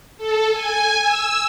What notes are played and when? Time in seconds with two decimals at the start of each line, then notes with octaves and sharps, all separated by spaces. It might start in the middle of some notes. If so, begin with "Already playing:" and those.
0.18 A4
0.52 G#5
1.00 E6